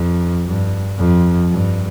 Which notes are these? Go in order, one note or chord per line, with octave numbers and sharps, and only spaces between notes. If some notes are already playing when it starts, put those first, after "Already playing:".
Already playing: F2
G2
F2
G2